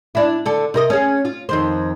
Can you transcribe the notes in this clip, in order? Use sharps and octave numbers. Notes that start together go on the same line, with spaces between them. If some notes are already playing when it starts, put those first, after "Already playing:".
D4 E4
D3 A4
C3 A#4 D#5
C#4 G#4
F4
F2 D#3 C5